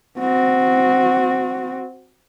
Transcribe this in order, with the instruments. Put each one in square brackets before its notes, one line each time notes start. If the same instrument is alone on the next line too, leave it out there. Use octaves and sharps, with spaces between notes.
[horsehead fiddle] C4 F#4